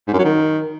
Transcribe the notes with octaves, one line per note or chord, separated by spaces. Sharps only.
G#2
F#2
F#3
D#3